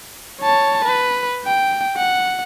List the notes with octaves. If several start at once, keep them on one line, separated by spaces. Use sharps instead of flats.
C#5 A5
B4
G5
F#5